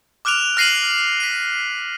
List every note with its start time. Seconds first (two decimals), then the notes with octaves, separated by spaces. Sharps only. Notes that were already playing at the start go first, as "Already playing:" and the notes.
0.25 D6 F6 F#6 D7 F7
0.57 F6 A#6 C7 D#7 F#7
1.20 B6 D#7